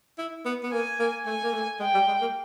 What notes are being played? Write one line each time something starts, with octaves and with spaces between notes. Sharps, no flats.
E4
B3
B3
A#3 G#5
A#3
A3 G#5
A#3
A3
G#3 G5
G3
G#3
A#3